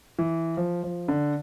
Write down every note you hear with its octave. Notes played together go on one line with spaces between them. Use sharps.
E3
F3
F3
D3